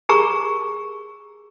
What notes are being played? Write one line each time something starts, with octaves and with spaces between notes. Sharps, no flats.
G4 G#4 A#4 A#5 C#6